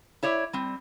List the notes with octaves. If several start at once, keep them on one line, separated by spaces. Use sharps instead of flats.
E4 C#5 D5 E5
G3 C4